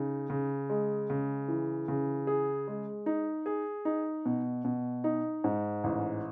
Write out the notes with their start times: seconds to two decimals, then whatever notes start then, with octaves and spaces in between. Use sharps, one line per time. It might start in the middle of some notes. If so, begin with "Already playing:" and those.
Already playing: C#3 D#4
0.30 C#3
0.70 G#3
1.10 C#3
1.48 E3
1.88 C#3
2.27 G#4
2.68 G#3
3.06 D#4
3.46 G#4
3.85 D#4
4.26 B2
4.65 B2
5.04 D#4
5.44 G#2
5.84 A1